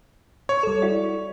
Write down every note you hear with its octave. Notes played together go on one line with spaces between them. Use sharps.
C#5
G3 A4
E4 F#4 D5